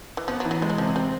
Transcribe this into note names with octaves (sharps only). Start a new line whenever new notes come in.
E3
F3 B3
F#3
E3
F#3
G3 G#3
F#3
C3 F3
F#3
G3 C4